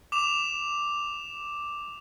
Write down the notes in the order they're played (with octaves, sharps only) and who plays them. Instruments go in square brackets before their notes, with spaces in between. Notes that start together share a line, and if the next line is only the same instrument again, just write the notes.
[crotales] D6 E7 F7